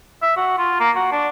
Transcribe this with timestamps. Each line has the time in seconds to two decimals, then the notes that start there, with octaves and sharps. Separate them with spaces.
0.22 E5
0.36 F#4
0.58 F4
0.80 A#3
0.95 F#4
1.12 D4